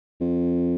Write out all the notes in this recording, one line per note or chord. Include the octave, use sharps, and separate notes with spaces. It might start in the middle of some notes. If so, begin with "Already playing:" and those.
F2